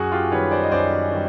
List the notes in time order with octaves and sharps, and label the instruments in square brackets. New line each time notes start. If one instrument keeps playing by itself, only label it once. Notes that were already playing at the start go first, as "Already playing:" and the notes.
Already playing: [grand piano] F#2 F#4 G#4
F4 G4
D#3 G3 B4 C#5
C5 D5
D#5
F#2 C5 D5
D#3 G3